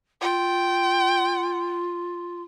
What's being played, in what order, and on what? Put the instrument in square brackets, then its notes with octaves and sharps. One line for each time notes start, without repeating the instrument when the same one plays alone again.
[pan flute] F4 [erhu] G5